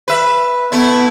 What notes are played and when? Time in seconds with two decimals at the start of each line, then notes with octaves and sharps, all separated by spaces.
0.08 B4 E5
0.72 A3 B3 E4